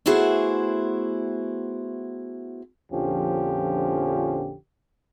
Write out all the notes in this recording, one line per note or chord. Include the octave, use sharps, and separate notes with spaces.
A3 B3 E4 F#4 G#4 C5
A#1 F2 D3 F3 C#4 G4